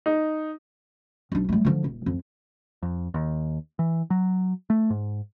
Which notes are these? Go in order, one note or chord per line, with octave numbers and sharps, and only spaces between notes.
D#4
B1 D4
G3 A3
D3 F3
D#1
F2
F2
D#2
E3
F#3
A3
G#2